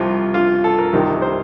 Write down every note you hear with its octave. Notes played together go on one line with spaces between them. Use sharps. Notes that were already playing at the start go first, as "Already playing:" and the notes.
Already playing: C2 C3 F3 F4
F4
A4
A#4
C2 C3 D#3 G3
C5